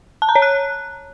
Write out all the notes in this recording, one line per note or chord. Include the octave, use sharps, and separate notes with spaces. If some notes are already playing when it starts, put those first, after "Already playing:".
A5
A#5
C#5
F#6